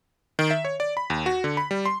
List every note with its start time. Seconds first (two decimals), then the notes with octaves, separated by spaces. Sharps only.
0.39 D#3
0.51 E5
0.65 C#5
0.80 D5
0.97 B5
1.10 D#2
1.26 F#4
1.44 D3
1.57 B5
1.71 G3
1.86 C6